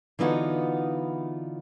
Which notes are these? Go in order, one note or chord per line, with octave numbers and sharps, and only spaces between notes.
D3 E3 B3 D#4 F4 F#4